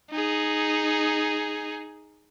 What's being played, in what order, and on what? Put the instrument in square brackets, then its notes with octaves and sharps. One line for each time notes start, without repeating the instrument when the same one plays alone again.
[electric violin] D#4 G#4